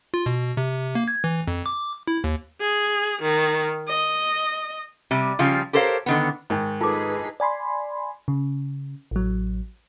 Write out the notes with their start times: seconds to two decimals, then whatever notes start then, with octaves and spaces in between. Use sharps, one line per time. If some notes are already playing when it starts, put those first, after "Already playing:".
0.14 F4
0.26 B2
0.57 C3
0.95 A#3
1.08 G#6
1.24 E3
1.47 F2
1.66 D6
2.08 E4
2.24 D#2
2.61 G#4
3.22 D#3
3.88 D#5
5.11 C3 G3
5.39 C#3 F3 G3 F4
5.73 G4 A4 A#4 C5 C#5 F5
6.06 D3 D#3 B3
6.50 G#2 D#3
6.81 D#4 F4 G#4 A4 B4 D6
7.40 D5 G#5 B5 C6
8.28 C#3
9.11 A1 F#3